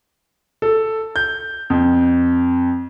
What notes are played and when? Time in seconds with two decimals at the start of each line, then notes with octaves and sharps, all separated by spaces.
0.62 A4
1.16 G6
1.70 F2